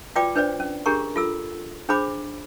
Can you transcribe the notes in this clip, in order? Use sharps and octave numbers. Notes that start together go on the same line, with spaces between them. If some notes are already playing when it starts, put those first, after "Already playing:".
F4 F#4 B4 D5 G5 D6
D4 B4 C5 D5
C#4
D4 G4 G#4 A#4 A#5 C#6
F4 A4 E6
D4 G#4 C5 B5 D6